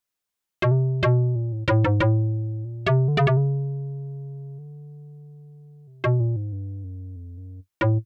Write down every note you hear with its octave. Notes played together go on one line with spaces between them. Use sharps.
B2
C3
B2
A#2
A2
A2
G#2
A2
A#2
C3
D3
C#3
C3
C#3
D3
C3
B2
A#2
G#2
G2
F#2
F2
F#2
A2